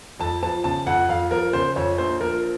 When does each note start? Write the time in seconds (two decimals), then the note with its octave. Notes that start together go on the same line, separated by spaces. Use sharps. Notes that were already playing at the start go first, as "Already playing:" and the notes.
0.19 F2 A5
0.43 F3 A5
0.64 C#3 A5
0.86 F2 F#5
1.09 F2 F5
1.31 F3 A#4
1.53 C#3 C5
1.76 F2 C#5
1.98 A#1 C5
2.21 F3 A#4